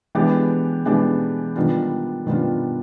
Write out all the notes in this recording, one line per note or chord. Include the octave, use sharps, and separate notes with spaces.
E3 G#3 B3 D4 G4
E3 G#3 B3 D4 G4
D#3 G3 B3 D4 F4
D#3 G3 B3 D4 F4